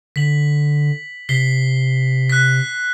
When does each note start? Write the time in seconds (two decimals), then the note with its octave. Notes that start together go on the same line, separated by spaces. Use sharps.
0.16 D3 B6 F#7
1.29 C3 B6 C7 G7
2.30 F#6 B6